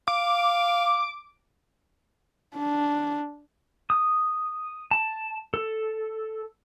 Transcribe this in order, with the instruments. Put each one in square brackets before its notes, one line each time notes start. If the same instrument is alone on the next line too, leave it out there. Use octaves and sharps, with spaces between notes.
[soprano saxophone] F5 [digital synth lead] D6
[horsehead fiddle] D4
[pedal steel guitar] D#6
A5
A4